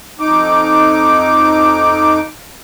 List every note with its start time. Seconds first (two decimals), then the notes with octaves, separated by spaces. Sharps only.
0.19 F2 D#4 D6